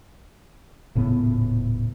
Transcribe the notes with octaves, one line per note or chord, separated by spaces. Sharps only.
D#1 A2 C#3 B3